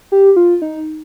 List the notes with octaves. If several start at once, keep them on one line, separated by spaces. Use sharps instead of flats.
G4
F4
D#4